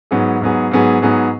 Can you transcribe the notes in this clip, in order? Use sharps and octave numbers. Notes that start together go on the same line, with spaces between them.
G#2 F#3 B3 G#4
G#2 F#3 B3 G#4
G#2 F#3 B3 G#4
G#2 F#3 B3 G#4